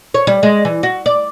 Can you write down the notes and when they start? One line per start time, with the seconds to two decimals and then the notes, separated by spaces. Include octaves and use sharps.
0.14 C#5
0.27 G3
0.43 G#3
0.65 E3
0.83 F#4
1.06 D5